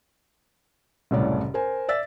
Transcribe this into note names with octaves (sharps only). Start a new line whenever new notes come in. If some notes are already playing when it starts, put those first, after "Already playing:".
F#1 C2 A2 C#5 D5
A#4 C5 G#5
D5 E5 E6 A6 B6